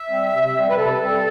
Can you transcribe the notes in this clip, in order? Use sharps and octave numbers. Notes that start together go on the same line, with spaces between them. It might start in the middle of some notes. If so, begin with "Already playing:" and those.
Already playing: E5
G3 C4
C3
G3 C4
B4
C3 A4
G3 C4